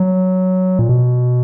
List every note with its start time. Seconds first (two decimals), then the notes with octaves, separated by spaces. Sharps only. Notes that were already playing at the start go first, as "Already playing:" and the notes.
Already playing: F#3
0.79 A#2
0.89 B2